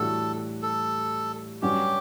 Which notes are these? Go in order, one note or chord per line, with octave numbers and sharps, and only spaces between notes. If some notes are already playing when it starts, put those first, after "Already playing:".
Already playing: A2 E3 G3 D4 F#4 A4
A4
G2 F#3 C#4 F#4 G4